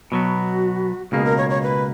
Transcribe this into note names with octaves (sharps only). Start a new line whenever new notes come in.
B2 F#3 B3 F#4
C#2 B2 A#3 G#4
A#4
C#5
C#5
B4